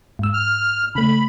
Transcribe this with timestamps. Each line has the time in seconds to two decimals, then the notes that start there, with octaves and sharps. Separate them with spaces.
0.19 G#2 E6
0.34 F6
0.95 C#3 A3 B5